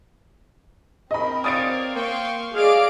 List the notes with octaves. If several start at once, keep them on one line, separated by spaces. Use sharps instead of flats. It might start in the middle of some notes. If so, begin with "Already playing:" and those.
C4 A#4 D#5 B5
C#5 D5 F5 D#6 A6 D7
A#3 F5 G5 C6 C#6
G#4 D5 D#5 F5 D7